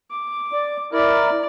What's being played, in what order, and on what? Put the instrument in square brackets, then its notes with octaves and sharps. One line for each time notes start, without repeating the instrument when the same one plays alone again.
[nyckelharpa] D6
[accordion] D5
[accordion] E4 A#4 [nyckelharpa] D5